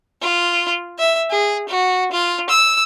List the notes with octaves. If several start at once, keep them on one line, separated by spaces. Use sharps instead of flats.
F4
E5
G#4
F#4
F4
E6